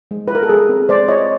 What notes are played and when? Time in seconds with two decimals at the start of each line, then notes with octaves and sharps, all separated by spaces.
0.11 G#3
0.28 F4 B4
0.35 A#4
0.43 A4
0.49 G#3 G#4
0.69 C4
0.89 G#3 C5 D5
1.08 F4 C#5 D#5